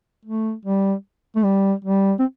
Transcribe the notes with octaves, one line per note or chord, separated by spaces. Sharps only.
A3
G3
A3
G3
G3
C4